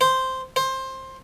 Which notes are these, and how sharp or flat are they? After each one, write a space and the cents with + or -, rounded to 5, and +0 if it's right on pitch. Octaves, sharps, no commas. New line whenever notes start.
C5 -5
C5 +15